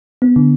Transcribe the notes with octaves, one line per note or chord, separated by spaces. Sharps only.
B3
D3